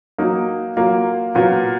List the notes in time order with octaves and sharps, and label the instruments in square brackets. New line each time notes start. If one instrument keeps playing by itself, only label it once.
[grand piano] F#3 A#3 D#4
F#3 A#3 F4
A#2 F#3 B3 F4